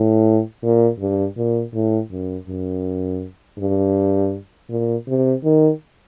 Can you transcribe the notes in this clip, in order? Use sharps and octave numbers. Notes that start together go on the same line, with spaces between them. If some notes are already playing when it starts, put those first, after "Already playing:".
Already playing: A2
A#2
G2
A#2
A2
F#2
F#2
G2
A#2
C3
D#3